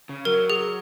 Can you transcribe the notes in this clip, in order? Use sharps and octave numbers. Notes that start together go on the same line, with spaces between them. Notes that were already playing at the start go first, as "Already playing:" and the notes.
C#3
F#3 A#4
G#4